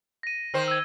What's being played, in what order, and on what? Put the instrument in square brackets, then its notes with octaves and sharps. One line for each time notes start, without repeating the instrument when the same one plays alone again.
[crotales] A#6 D#7
[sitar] D#3 C5
[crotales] E6 G#6